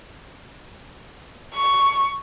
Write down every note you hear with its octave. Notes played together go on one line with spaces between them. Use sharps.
C#6